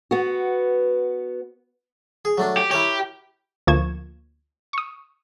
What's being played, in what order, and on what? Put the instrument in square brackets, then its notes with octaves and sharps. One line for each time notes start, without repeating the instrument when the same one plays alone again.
[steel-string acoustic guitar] B3 F#4
[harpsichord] G#4
F#3 A3 D4
[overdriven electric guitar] G4
[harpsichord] E4 A#4 C#5 [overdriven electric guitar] G4
[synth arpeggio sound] D2 F3 A#3 C#6 G#6 E7
C#6 D#6